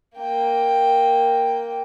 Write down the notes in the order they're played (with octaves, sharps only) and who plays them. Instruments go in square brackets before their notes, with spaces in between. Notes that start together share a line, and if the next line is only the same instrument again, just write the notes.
[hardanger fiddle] A#3 G5